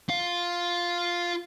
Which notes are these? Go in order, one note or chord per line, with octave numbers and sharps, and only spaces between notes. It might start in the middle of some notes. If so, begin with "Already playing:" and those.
F4 F5